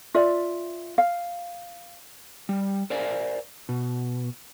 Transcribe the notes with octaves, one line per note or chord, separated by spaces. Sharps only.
F4 D5 E5
F5
G3
A#4 C5 D5 F5 G#5
B2